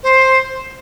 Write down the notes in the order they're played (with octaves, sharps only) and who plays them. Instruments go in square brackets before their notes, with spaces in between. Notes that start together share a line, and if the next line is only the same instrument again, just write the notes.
[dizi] C5